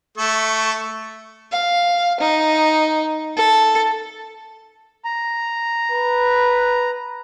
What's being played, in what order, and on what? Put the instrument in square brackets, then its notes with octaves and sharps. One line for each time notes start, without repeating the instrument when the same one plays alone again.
[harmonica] A3 A4 C#6
[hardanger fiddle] F5
D#4
A4
[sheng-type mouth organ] A#5
[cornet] B4